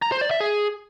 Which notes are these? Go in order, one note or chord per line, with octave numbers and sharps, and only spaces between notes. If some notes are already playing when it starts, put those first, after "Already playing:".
A#5
C5
D5
E5
G#4